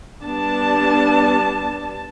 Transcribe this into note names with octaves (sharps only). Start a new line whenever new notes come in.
G3 B3 D4 A5